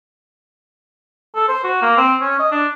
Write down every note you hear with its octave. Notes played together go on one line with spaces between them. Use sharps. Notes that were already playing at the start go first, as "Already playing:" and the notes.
A4
C5
F#4
A#3
C4
C#4
D#5
D4